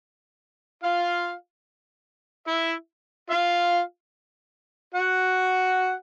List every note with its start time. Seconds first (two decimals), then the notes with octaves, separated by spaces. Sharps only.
0.83 F4 F5
2.47 E4 E5
3.30 F4 F5
4.94 F#4 F#5